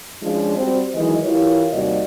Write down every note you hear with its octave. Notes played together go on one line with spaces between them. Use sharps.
F3 G#3 C#4 D4 F4
G3 C4 F#4 C5
D#3 E3 F#3 G#3 D#5
E3 E4 F4 G4 A#4 C#5
D#2 C3 G3 F#4 D5 D#5